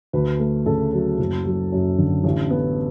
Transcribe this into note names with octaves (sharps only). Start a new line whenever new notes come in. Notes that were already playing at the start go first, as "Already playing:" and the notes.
D2 B4
A3
C#3 A4
F#3
F#1
F#3
F#2
D3
A1
B3